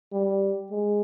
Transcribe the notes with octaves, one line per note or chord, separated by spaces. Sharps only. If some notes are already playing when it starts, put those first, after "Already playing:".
G3
G#3